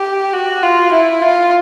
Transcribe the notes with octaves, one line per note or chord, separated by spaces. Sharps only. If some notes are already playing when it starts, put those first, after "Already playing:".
Already playing: G4
F#4
F4
E4
F4